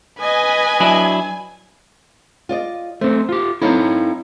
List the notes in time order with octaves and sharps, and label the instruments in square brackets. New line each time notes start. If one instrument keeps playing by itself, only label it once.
[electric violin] B4 D#5 [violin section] G#5
[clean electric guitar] F#3 D4 E4
[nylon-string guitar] F4 D5 D#5
[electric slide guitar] A3 C4 [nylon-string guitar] C5
[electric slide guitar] F4 G4
[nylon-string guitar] C4 D#4 A4 [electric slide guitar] E4 C#5 F5